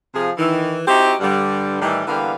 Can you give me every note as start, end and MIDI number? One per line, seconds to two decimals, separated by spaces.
0.13 0.30 48
0.13 0.30 53
0.13 0.30 68
0.38 0.79 51
0.38 0.79 52
0.88 1.14 60
0.88 1.14 63
0.88 1.14 64
0.88 1.14 66
0.88 1.14 67
1.20 1.78 43
1.20 1.78 50
1.20 1.78 55
1.81 2.03 45
1.81 2.03 51
1.81 2.03 52
1.81 2.03 55
2.07 2.34 50
2.07 2.34 52
2.07 2.34 55
2.07 2.34 58
2.07 2.34 59
2.07 2.34 77